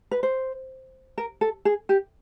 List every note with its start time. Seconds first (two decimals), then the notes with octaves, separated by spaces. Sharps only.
0.11 B4
0.23 C5
1.18 A#4
1.41 A4
1.65 G#4
1.89 G4